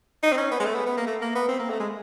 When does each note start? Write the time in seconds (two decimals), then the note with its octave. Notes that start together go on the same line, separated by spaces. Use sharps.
0.23 D#4
0.32 C4
0.37 C#4
0.51 B3
0.60 G#3
0.65 A3
0.75 B3
0.86 B3
0.97 A#3
1.07 A3
1.21 A#3
1.35 B3
1.49 C4
1.59 A#3
1.70 A3
1.80 G#3